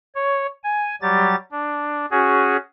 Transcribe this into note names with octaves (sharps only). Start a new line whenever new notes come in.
C#5
G#5
F#3 G3 G4 A6
D4
C#4 F#4 G#4